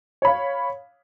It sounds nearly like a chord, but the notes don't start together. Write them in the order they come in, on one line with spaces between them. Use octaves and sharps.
C#5 B5 F5